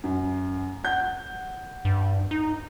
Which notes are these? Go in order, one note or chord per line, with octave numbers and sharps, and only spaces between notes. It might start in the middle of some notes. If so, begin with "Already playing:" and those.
F#2
F#5 G6
G2
D#4